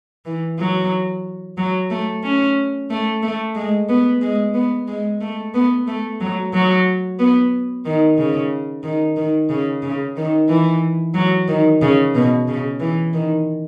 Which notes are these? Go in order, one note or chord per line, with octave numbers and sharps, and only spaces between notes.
E3
F#3
F#3
A3
C#4
A3
A3
G#3
B3
G#3
B3
G#3
A3
B3
A3
F#3
F#3
B3
D#3
C#3
D#3
D#3
C#3
C#3
D#3
E3
F#3
D#3
C#3
B2
C#3
E3
D#3